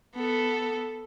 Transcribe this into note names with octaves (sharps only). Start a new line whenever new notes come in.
B3 A4